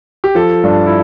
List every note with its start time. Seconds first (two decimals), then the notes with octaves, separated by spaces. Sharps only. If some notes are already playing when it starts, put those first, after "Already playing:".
0.24 G4
0.35 F3 A4
0.64 G2 D4
0.86 E4